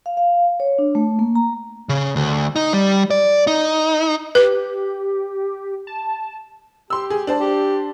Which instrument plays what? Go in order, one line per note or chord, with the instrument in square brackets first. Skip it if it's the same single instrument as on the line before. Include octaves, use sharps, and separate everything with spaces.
[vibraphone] F5
F5
C#5
D4
A3
A#3
A#5
[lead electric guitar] C#3
D2
D#4
G3
D5
D#4
[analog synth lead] G4 [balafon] B4
[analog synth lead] A5
[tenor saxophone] G4 [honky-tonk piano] C6 E6
[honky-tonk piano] G#4
D4 C5 A5
[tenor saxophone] G4